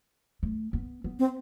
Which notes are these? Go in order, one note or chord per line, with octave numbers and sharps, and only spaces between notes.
A3
B3
B3
C4